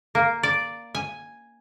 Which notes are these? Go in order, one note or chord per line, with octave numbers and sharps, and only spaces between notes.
A#3
D5
G#5